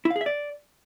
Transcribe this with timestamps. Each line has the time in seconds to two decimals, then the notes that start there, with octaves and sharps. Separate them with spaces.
0.05 E4
0.10 F5
0.16 G#4
0.21 E5
0.26 D5